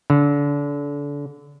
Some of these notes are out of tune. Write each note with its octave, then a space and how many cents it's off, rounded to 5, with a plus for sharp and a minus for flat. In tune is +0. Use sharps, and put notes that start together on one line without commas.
D3 -30